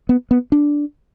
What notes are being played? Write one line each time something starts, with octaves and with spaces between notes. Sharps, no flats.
B3
B3
D4